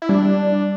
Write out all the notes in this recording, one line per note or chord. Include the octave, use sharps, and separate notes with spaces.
E4
G3 D4